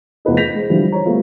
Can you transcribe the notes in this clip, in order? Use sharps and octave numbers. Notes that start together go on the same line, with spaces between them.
F1 E2 F4 B4 D#5
G6 A#6 B6 F7
G#3 C5
D3 E3 F3 G3
C5 C#5 A#5
G3 A3 B3 F4